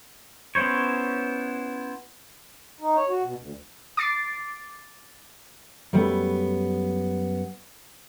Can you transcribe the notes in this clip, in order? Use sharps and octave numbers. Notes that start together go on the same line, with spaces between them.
B3 C#4 E4 C5 C#5
D#4
C#5
F#4
B2
D2
D6 A6 C7 D7
F#2 G3 A3 B3